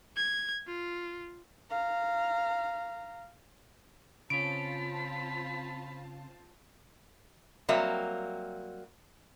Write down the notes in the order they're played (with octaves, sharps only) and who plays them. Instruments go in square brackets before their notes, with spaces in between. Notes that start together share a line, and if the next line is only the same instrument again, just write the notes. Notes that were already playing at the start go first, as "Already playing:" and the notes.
[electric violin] G#6
F4
[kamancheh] F5 A#5
[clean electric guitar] C#3 C#4 [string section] C4 F4 A5 [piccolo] B5 [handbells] D7
[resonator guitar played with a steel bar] F#3 G3 A#3 C4 E5